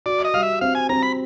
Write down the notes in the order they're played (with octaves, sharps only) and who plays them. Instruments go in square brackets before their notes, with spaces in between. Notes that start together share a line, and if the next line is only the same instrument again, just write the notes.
[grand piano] F#4 [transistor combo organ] D5
[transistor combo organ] D#5
[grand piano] G3 [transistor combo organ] F5
[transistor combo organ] E5
[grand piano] C4 [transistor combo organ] F5
[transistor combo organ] G#5
[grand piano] C4 [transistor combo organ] A#5
[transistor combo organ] B5